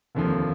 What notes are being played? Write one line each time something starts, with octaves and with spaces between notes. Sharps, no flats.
F1 D#2 D3 F3